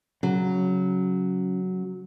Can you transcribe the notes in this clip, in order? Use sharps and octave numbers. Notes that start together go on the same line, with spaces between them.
C#3 F#3